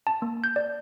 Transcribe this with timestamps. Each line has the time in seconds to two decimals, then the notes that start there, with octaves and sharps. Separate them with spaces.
0.07 A5
0.22 A#3
0.44 G6
0.56 D5